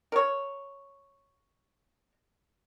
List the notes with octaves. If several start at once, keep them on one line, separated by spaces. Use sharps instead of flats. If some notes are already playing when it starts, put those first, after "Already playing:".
A#4 C#5